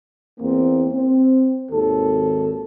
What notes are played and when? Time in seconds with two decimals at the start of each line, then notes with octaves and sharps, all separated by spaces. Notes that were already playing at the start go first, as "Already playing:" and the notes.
0.40 E2 A#3 C4
0.92 C4
1.72 G#1 D#2 A4